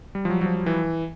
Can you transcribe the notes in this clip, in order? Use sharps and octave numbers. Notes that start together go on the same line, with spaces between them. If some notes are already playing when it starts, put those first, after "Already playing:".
G3
F3
F#3
F#3
F3
F#3
E3